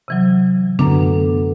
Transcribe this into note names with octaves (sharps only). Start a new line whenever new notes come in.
C3 E3 F#3
F#2 D3 B3 D4